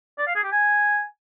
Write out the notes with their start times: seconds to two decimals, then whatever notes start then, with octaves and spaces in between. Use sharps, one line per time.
0.18 D5
0.26 F5
0.35 G#4
0.43 G4
0.52 G#5